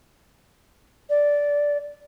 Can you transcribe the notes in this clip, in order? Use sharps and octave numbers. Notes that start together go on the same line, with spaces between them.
D5